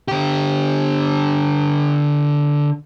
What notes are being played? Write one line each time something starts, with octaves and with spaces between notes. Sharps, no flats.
D3 G4